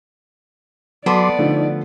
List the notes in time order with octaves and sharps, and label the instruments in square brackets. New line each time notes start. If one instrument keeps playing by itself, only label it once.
[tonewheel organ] F#3 C6 D6 [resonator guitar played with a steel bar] B3 A5 [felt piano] A4 [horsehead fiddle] D5
[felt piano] D3 F3 A3 [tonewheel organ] D#4